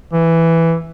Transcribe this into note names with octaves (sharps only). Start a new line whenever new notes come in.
E3